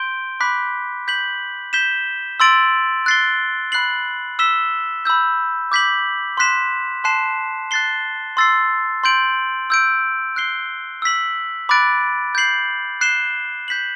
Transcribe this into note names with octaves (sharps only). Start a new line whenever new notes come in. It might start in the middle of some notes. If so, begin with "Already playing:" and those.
Already playing: C6 G6 D7 G7
B5 D6 F#6 B6
G6 B6 F#7
G6 B6 E7 G7
C6 E6 A6 D7 F#7
F#6 A6 C7 G7
B5 F#6 C7 F#7
E6 B6 E7 G7
B5 E6 G6
D6 G6 B6 F#7
C6 F#6 B6 E7
A5 C6 F#6 C7 E7
F#6 A6 C7 G7
C6 E6 A6 C7
C6 G6 D7 F#7
E6 G6 D7
F#6 C7 G7
E6 B6 F#7
B5 D6 F#6 A6 D7
G6 C7 F#7
F#6 C7 E7 G7
G6 B6 F#7